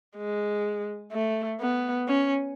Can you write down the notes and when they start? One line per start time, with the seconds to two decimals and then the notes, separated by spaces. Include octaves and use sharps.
0.17 G#3
1.12 A3
1.60 B3
2.08 C#4